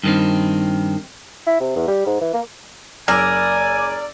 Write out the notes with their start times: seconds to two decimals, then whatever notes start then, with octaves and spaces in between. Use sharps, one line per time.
0.04 G2 D#3 C4
1.46 E4
1.60 C3
1.76 E2
1.88 G3
2.06 G#2
2.21 E3
2.33 A#3
3.08 F#1 A#4 D5 G#5 E6